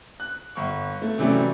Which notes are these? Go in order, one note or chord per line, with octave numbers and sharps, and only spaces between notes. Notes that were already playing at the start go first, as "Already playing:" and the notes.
F#6
G1 C#6
A3
C3 E3 F#3 G3 A3 C#4